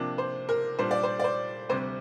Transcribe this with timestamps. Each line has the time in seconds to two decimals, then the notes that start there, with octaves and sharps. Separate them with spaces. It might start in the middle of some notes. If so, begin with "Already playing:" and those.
Already playing: C3 F3 A#3 D4
0.18 C5
0.49 A#4
0.79 A#2 G3 D4 C5
0.91 D5
1.03 C5
1.19 D5
1.24 C5
1.69 D2 C3 G3 C5